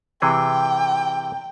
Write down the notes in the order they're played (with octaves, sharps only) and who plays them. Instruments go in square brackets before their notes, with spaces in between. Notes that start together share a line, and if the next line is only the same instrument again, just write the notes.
[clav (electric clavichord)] C3 E3 G#4 [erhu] G5